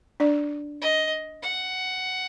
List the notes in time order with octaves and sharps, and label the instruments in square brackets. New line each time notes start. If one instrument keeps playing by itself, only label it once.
[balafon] D4 D5
[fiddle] D#5
F#5